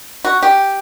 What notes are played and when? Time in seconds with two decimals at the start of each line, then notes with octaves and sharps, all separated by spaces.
0.25 F#4
0.43 G4